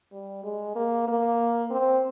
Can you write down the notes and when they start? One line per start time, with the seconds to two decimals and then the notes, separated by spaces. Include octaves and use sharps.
0.12 G3
0.44 G#3
0.76 A#3
1.08 A#3
1.71 C4